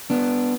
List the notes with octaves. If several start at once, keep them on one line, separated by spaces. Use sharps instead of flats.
B3 D4